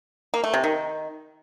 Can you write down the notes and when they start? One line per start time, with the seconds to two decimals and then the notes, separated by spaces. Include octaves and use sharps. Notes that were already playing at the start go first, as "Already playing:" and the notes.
0.34 A#3
0.44 A3
0.54 C3
0.64 D#3